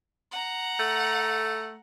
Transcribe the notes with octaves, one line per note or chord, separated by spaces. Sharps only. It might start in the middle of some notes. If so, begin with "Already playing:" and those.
F#5 A#5
A3